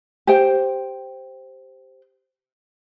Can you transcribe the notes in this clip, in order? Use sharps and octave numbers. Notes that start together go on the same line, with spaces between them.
G4 C5 G5